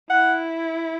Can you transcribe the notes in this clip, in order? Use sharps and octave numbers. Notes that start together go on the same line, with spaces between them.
E4 F#5